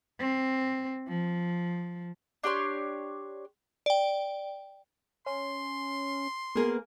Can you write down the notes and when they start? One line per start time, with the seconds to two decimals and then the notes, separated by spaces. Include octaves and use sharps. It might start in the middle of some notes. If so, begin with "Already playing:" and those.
0.19 C4
1.09 F3
2.43 D4 G4 C#5 C6
3.86 D5 G5
5.26 C#4 C6
6.55 A#3 B3 G#4 A#4